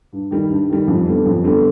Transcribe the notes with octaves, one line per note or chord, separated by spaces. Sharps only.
G2
D#3 G3
G2
D#3 G3
F2
D3 G3 B3
F2
D3 G3 B3